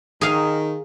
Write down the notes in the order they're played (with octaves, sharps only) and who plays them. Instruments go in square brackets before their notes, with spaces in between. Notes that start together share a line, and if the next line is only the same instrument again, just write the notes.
[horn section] D#3 [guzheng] G#4 F5